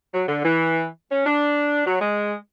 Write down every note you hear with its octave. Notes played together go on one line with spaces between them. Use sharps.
F#3
D3
E3
C#4
D4
F#3
G#3